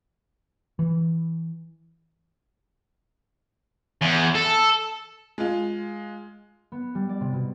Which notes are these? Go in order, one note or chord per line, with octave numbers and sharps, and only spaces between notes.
E3
E2
A4
G#3 F4
B3
G3
D5
C3
B2